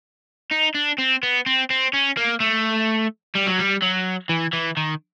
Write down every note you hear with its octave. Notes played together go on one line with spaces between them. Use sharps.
D#4
D4
C4
B3
C4
C4
C#4
A#3
A3
G3
F#3
G3
F#3
E3
E3
D#3